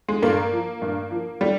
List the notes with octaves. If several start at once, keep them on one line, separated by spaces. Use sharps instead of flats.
G#3
G2 A#3
F3
G2
F3
G3